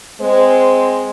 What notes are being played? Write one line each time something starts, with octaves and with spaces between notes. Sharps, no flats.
G#3 C4 C5